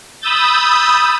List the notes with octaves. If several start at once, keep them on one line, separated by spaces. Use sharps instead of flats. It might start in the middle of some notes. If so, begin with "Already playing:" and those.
B5 D#6 E6 G6 A6